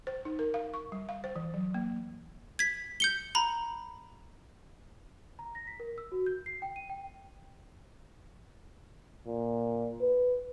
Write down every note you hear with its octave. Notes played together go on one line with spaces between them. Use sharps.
C5
D#4
A#4
F5
C#6
G3
F5
C5
E3
F#3
A#3
G#6 B6
G6 C#7 G7
A#5 B5
A#5
A#6
B6
A#4
E6
F#4
G6
C7
G5
D#7
G5
A#2
B4